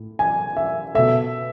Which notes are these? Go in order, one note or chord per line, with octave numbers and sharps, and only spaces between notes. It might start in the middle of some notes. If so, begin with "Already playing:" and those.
Already playing: A2
G#5
E5
B2 A3 E5